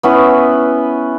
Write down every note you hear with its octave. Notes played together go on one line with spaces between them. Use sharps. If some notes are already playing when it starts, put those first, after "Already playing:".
B3 C#4 E4